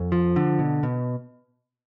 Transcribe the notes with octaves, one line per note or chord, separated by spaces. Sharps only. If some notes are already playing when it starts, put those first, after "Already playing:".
Already playing: F2
F3
D3
B2
B2